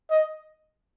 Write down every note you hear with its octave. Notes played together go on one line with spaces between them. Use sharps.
D#5